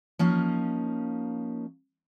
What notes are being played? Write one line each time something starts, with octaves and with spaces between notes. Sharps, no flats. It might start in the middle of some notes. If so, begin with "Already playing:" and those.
F3 A#3 C#4 D#4